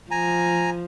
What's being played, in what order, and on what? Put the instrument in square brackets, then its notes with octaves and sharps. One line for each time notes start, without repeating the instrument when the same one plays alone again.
[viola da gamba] F3 [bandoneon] G#5 A#5